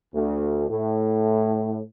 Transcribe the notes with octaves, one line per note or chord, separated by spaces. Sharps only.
D2
A2